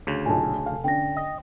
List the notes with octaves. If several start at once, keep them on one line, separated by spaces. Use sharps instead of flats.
D2 C#3
B1 A#2 G#5 A5
F1 F5
D3 C#4 D4 G5 A#6
D#5